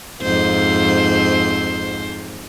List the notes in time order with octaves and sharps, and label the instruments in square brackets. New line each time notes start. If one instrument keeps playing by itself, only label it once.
[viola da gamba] F2 G#2 C5